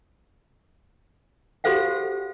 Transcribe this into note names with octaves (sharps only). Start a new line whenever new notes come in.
F#4 G4 A4 C5 F5 F#5